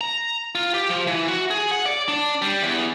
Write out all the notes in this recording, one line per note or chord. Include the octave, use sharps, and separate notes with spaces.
A#5
F4
G4
F3
E3
F#4
G#4
F#5
D5
D4
G3
E2